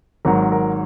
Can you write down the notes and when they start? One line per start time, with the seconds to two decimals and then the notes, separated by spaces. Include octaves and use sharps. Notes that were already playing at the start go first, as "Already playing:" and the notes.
0.25 G#1 G#2 F#3 A#4
0.52 A#4